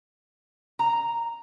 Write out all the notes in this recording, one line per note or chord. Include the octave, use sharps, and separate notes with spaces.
A#5